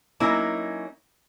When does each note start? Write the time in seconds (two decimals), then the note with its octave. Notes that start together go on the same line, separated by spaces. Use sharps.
0.20 F#3 A#3 C#4 D#4 E4